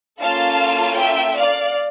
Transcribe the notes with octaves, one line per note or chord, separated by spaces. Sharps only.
A#3 C#4 F4 A4 F5 A5
E5 G5
D5 F5